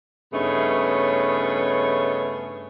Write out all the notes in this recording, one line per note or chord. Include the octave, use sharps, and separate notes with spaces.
G2 C#3 A3 B3 D#4 C#5